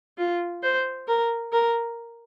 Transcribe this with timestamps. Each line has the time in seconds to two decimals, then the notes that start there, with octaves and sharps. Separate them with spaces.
0.18 F4
0.63 C5
1.07 A#4
1.52 A#4